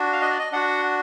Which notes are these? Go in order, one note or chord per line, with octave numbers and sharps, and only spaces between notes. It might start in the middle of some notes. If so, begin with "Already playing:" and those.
Already playing: D4 F#4
F5
D#5
D5
D#5
D4 F#4 F#5